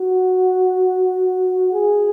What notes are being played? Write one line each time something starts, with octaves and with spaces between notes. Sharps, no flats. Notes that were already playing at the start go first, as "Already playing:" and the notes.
Already playing: F#4
G#4